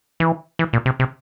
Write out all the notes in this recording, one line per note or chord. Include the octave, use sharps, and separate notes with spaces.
E3
E3
A#2
C3
C3